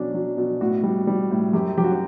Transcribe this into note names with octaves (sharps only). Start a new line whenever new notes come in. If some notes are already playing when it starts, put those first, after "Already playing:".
Already playing: B2 F#3 C#4 D4
F#3
B2
A2 F#4
G3
G3
A2
F#2 G4
F#2 G4
F#4
G4